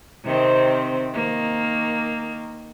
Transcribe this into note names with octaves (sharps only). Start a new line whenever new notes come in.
C3 D#3 C4
D#3 A#3